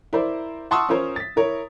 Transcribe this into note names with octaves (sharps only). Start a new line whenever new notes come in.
E4 A#4 C5 D5
F#5 A5 C6 C#6 D#6 E6
C#4 F4 A#4 C5 C#5
A6 B6
E4 A#4 C#5